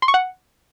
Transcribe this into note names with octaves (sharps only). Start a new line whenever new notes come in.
C6
C#6
F#5